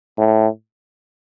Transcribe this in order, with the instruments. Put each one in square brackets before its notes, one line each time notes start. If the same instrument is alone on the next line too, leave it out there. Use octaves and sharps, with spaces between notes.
[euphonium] A2